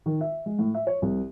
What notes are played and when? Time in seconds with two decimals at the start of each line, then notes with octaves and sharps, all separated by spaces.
0.06 D#3
0.21 E5
0.46 G#3
0.59 A2
0.75 E5
0.87 C#5
1.02 C2